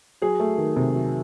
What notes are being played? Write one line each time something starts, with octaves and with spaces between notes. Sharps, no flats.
F#3 G#4
A3
D#3
C3
F#3